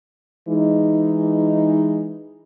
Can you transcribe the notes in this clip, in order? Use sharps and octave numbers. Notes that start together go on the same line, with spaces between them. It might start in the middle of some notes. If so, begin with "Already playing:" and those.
E3 G#3 D#4